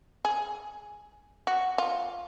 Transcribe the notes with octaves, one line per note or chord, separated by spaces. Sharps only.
G#4
F#4
F4